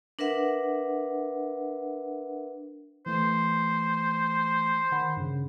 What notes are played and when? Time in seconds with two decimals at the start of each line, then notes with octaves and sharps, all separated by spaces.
0.19 D4 A#4 B4 E5 F#5
3.06 E3 A3 C5
4.92 D#3 F#5 B5
5.17 G2 C#3